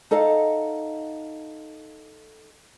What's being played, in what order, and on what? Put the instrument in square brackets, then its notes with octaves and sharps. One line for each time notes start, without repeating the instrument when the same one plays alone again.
[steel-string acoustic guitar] D#4 A4 D#5 F5 F#5